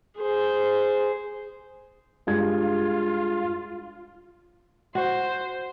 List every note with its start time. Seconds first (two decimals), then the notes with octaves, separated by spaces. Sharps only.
0.20 G#4 C5
2.27 G2 G#3 F4 G#6
4.95 F#4 C5